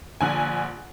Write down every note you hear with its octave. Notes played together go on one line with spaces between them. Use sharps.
A#1 D3 G#5